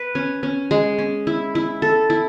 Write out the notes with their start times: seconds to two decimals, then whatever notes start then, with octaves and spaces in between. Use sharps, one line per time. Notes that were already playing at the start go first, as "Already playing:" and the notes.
Already playing: B4
0.15 C#4
0.43 C#4
0.71 G#3
0.99 C#4
1.27 E4
1.55 E4
1.82 A4
2.10 E4